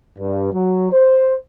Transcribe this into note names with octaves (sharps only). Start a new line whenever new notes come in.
G2
F#3
C5